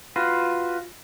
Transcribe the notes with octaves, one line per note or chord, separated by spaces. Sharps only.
F4 F#4 B4